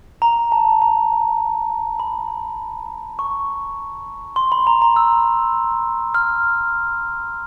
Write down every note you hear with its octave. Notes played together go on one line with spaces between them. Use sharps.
A#5
A5
A#5
B5
C#6
C6
B5
A#5
A#5
E6
F6